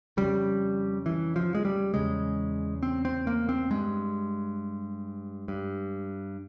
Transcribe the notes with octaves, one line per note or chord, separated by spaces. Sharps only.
F2 C#3 G3
E3
F3
G#3
G3
E2 C#3 G#3
C4
C4
A#3
C4
G2 G#3
G2